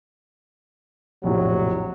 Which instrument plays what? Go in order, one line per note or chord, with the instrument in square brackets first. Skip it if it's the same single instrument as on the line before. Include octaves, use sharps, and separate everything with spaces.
[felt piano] F1 A#1 A2 [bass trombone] F#3